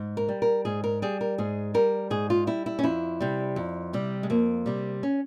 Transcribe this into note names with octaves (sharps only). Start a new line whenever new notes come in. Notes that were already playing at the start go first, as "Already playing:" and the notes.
Already playing: G#2
A#4
G3
A#4
G#2 G#4
A#4
G3 G#4
A#4
G#2 G#4
G3 A#4
G#2 G#4
F4
G3 E4
E4
C#4
F2 E4
C3 G3
F2
C3 G3
G#3
F2 A#3
C3 G3
C#4